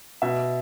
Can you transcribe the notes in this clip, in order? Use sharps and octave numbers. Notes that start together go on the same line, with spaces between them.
B2 E5